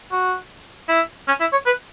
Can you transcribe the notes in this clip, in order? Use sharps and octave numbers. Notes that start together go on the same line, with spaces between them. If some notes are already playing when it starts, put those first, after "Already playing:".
F#4
E4
C#4
E4
C#5
B4